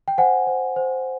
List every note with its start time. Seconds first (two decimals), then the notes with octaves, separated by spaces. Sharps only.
0.08 G5
0.18 C5 F#5 G#5
0.47 C5
0.76 C5